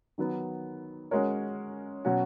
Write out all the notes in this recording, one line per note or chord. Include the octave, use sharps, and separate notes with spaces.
D#3 F#3 B3
G#3 C#4 F#4 A#4 C#5
B2 F#3 C#4 F#4